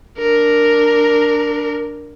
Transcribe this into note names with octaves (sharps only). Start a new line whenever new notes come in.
D4 A#4